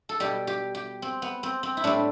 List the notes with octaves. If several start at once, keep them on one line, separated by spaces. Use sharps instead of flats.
A4
B2 G3 G4
G4
G4
C4
B3
C4
C4
E4
A2 G3 D4